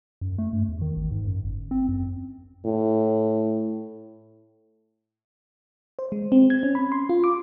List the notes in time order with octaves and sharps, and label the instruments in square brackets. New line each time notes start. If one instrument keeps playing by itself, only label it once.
[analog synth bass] F#2
A3
G2
E2
D#3
G#1
G#2
F#2
G1
C4
F#2
[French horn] A2
[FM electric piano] C5
G#3
C4
G#6
C#4
B5
C6
F4
D6